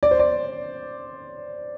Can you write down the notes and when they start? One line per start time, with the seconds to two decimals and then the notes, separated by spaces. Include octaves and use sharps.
0.03 D5
0.11 C5
0.19 D5